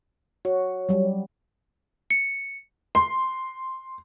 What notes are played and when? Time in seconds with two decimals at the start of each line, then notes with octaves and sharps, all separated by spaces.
0.45 F#4 C#5
0.89 F#3 G3
2.10 C#7
2.95 C6